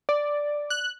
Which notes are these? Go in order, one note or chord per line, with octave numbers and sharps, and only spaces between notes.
D5
F#6